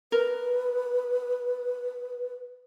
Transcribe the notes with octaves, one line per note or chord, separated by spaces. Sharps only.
A#4 B4